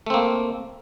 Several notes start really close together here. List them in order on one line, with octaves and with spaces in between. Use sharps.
A3 C4 A#3